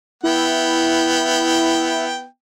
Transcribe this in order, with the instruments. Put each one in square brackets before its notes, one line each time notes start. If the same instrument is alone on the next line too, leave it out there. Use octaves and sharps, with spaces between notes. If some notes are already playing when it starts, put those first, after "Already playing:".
[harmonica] B3 G5 [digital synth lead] E4